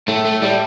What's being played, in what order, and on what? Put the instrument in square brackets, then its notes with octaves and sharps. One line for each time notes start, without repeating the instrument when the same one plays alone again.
[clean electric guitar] A2 [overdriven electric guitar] A3
[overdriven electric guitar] A3
[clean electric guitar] A2 [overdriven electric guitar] G3